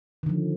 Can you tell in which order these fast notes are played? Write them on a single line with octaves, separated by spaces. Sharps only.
D#3 D3 F3